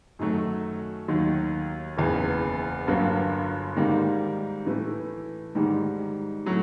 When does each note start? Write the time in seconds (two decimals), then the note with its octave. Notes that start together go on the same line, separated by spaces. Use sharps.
0.19 F#2 D#3 F#3 A3
1.08 D#2 D#3 F#3
1.97 F#1 E2 C#3
2.87 G1 G2 D3 F#3 A#3
3.76 G#2 D#3 G3 A#3
4.66 A2 E3 A3
5.55 G#2 D#3 G3
6.46 A2 F#3 A3